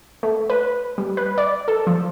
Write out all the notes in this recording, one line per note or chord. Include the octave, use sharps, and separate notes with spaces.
A3
B4
G3
B4
D5
A4
F3